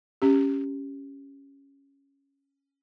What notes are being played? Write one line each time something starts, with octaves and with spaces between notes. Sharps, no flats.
C#4 G4